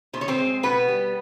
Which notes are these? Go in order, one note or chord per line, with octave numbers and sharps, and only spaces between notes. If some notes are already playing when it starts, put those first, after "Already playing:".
B2 C5
C#5
C4 C5
G#3
B2 B3 B4
G3